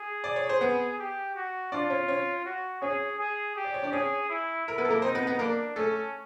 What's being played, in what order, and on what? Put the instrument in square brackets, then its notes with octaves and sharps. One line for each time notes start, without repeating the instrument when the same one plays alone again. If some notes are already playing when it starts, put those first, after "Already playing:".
Already playing: [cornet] G#4
[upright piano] D5
C#5
C5
B3 B4
[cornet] G4
F#4
[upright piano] D4 D5 [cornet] F4
[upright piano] C#4 C#5
C#4 C#5
[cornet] F#4
[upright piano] C#4 C#5 [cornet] G#4
[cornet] G#4
G4
[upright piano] D5
C#5
D4 D5
[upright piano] C#4 C#5 [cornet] G#4
[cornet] E4
[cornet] E4 [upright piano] A#4
[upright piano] B3 B4
A4
A#3 A#4
[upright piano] C4 C5 [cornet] D#4
[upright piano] B3 B4
B3 B4
[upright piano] A#3 A#4 [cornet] D4
[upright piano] A3 A4 [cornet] C#4